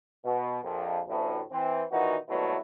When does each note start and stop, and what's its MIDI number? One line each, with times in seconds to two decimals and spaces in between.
0.24 0.58 47
0.63 1.00 34
0.63 1.00 41
1.07 1.41 33
1.07 1.41 38
1.07 1.41 45
1.52 1.83 52
1.52 1.83 60
1.92 2.16 46
1.92 2.16 51
1.92 2.16 52
1.92 2.16 63
1.92 2.16 66
2.29 2.57 32
2.29 2.57 43
2.29 2.57 47
2.29 2.57 54
2.29 2.57 57
2.29 2.57 64